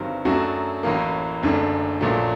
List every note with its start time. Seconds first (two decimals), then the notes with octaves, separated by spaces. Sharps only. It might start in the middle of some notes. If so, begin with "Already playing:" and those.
Already playing: G1 G2 D#3 F#3 C4
0.25 F#2 F#3 A3 D4 F#4
0.83 A1 A2 F#3 A#3
1.43 F#1 F#2 D3 A3 D4
2.01 A#1 A#2 F#3 A3